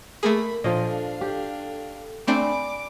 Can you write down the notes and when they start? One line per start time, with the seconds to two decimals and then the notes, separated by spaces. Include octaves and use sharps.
0.23 A3 A#3 G#4 A#4 B5
0.64 A#2 F3 D4 A4 D#5 F5
1.21 G4
2.27 A3 C4 D4 D5 G#5 B5 D6